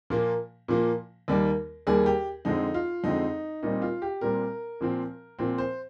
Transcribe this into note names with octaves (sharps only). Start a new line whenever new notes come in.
A#2 F3 A#3
A#2 F3 A#3
D#2 D#3 G3 A#3
D#2 D#3 G3 A#3 G#4
G4
F2 D3 F3 G#3 C4 D#4
F4
F2 D3 F3 G#3 C4 D#4
A#2 G3 C4 D#4
F4
G4
A#2 G3 C4 A#4
A#2 F3 C4
A#2 F3 C4
C5